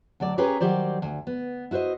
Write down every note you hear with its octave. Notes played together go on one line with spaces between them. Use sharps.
D2 F#3 A4 D5
C#4 G4 G#4 A#4 B4 C#5
D#3 F#3 G3 G4 C5 D5
D2
B3
E4 F#4 B4 C5 D#5